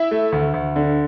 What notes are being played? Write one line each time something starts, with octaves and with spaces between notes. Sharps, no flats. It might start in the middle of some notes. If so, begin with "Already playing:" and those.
Already playing: E4 E5
A3
D2
D2
D3